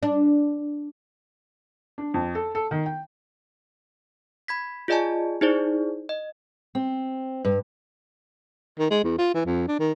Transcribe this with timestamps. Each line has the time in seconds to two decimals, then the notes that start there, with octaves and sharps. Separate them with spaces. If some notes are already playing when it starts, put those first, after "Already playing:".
0.03 D4
1.98 D4
2.14 F2
2.35 A4
2.55 A4
2.71 D#3
2.86 G5
4.48 B5 G#6 B6
4.88 F4 G#4 D5 D#5 G#5 A5
5.41 D#4 E4 G#4 C5 D5
6.09 D#5
6.75 C4
7.45 G2
8.79 D#3
8.91 G#3
9.04 E2
9.19 F4
9.34 E3
9.46 F2
9.68 D4
9.80 D#3